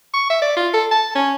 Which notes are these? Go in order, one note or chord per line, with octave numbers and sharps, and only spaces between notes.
C#6
E5
D5
F4
A4
A5
C#4